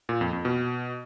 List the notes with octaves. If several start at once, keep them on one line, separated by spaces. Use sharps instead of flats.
A#2
F2
F2
B2